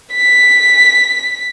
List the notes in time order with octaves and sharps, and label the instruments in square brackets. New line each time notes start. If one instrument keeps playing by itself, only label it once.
[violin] B6